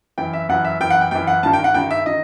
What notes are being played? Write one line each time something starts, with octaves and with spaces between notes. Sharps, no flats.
F#2 E3 G5
E5
F#2 E3 F#5
E5
F#2 E3 G5
F#5
G5
F#2 E3 G5
F#5
G2 D#3 A5
G5
F#5
G2 D#3 G5
E5
D#3 D#5